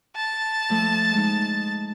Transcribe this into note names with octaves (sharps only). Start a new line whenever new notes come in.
A5
F3 A3 A4
G#3 D#4